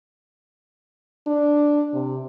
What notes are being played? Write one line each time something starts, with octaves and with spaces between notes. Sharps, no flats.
D4
C3